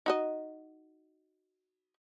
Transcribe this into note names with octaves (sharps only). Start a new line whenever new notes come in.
D#4 F#4 D#5